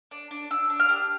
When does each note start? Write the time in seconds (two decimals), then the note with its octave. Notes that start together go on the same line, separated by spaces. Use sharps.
0.11 D4
0.31 D4
0.51 D4 E6
0.70 D4
0.80 F6
0.89 G4